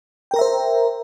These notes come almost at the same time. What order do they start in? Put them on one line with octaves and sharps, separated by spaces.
G5 A#4 A#5 E5 C5